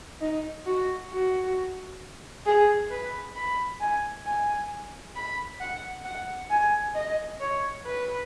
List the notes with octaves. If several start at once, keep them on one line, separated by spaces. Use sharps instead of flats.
D#4
F#4
F#4
G#4
B4
B5
G#5
G#5
B5
F#5
F#5
G#5
D#5
C#5
B4